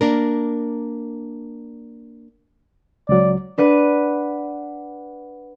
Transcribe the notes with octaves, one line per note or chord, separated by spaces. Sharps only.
A#3 D4 A#4
C#2 F#3 D5
D4 B4 F#5 D#7